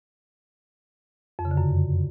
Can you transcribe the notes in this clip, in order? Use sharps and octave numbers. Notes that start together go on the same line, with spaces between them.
F2
C#3
D3
F#2